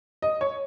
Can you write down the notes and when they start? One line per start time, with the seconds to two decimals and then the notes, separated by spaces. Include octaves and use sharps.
0.22 D#5
0.41 C#5